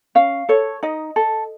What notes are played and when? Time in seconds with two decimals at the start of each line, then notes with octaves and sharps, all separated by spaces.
0.15 C#4 F5
0.49 A4 C#5
0.83 D#4 D#5
1.16 A4